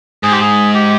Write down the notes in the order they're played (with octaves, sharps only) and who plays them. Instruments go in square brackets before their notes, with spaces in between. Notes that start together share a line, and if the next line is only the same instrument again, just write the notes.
[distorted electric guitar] G#2 [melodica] G#4
[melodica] G4
G#4
G4